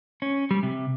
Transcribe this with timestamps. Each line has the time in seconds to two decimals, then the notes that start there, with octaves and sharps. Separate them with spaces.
0.22 C#4
0.51 G3
0.63 C3